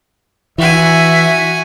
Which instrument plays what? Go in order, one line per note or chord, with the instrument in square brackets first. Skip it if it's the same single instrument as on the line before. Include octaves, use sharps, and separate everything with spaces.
[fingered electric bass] E3 [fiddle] F#4 G#5 [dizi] E5